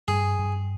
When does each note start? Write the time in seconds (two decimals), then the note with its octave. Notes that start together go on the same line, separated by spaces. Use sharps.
0.08 G2 G#4
0.39 G2